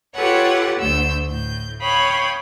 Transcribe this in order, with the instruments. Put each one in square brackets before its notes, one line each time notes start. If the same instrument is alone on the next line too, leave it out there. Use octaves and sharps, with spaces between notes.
[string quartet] F4 G4 A4 B4 C#5 F#5
D2 A3 E6 G6
A2 G6
C#5 F5 G5 B5 D#6